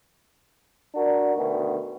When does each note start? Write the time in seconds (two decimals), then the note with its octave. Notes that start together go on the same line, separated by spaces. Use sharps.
0.95 D4 F#4 A#4
1.35 D2 B2 D#3